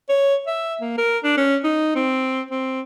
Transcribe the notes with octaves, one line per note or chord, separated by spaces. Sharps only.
C#5
E5
A#3
A#4
D4
C#4
D#4
C4
C4